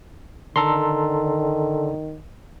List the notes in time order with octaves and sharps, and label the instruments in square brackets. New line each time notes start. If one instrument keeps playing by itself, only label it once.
[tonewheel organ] D3 [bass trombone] D#3 [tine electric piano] A4 A#5 C6